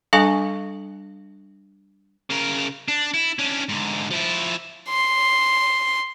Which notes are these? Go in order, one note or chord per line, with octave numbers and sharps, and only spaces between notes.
G3 D4 A4 F5 G#5 C#6
C#3 A#4
D4
E4
C#4 D4
G#2 D3
F3 E4
C6